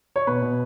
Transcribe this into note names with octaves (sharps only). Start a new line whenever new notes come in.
C#5
B2 B4
B2